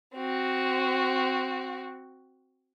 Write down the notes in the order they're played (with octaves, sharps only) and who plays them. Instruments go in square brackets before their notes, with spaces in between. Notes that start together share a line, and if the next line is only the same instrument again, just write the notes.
[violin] C4 F#4